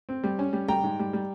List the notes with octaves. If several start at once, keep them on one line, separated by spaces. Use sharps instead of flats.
C4
G3
C#4
G3
G3 G5 A#5
G#2
G3
G3